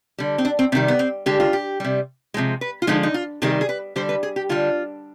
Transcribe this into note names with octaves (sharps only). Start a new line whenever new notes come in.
D3 G3
C4
D4
C4
C3 D#3 G3 C4
B3
C4
D3 G#3 G4
F4
G4
C3 G3
C3 F3 G#3
B4
F4
D3 F3 G#3 D#4
D#4
F4
C3 D#3 G3 G#4
G#4
B4
D3 G3 C5
B4
G#4
G4
D3 G3 F4